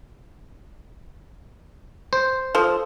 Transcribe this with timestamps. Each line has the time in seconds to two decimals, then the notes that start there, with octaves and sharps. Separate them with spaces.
2.13 C5
2.55 F3 A4 D#6